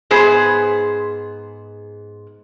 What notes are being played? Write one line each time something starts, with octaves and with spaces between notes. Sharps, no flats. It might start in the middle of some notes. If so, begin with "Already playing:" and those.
G#2 B3 G#4 C5